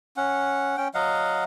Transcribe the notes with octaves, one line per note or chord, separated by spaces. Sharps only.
C#4 F#5
C#4 G5
F#3 D#5 F5 F#5